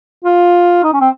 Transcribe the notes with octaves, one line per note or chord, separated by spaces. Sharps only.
F4
D#4
C#4
C4